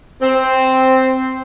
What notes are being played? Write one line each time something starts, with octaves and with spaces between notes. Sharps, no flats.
C4